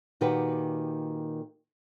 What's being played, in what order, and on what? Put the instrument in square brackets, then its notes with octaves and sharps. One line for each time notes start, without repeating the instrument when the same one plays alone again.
[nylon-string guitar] A#2 D#3 F#4 G4 B4